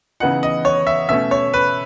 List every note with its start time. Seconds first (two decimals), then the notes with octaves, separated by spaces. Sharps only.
0.20 C#3 E3 B3 D#4 F#5
0.43 D#5
0.65 C#5
0.87 E5
1.09 B2 A3 C#4 E5
1.31 C#5
1.53 B4